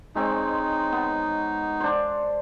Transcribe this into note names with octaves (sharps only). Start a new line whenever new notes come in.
G#3 C4 D#4 C#5
B3
D4 C5